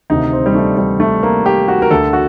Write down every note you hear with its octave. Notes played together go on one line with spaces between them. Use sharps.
D2 C3 D#3 D#4
C4
G3
A3
G3
A3
A#3
G4
F#4
A#4
D2 D3 A4
F#4